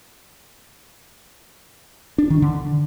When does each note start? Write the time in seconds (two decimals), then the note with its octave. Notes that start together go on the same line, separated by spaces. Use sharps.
2.18 D4
2.30 D#3
2.42 D3